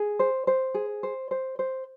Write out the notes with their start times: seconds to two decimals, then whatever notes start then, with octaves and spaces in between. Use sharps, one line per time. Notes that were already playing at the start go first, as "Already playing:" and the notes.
Already playing: G#4
0.19 C5
0.47 C5
0.74 G#4
1.03 C5
1.31 C5
1.59 C5